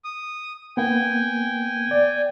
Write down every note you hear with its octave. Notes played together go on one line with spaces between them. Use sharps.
D#6
A#3 B3 G5 G#5
D5